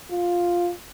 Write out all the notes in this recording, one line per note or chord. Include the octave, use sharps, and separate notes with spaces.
F4